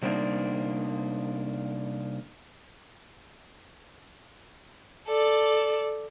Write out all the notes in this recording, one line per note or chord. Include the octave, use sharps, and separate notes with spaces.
C3 G3 A#3 C4 D4 D#4
A4 D5